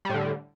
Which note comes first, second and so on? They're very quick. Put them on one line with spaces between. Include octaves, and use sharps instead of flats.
G3 A2 D3